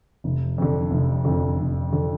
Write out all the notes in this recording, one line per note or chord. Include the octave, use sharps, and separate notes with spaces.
F1
F2 D3
F1
F2 D3
F1
D3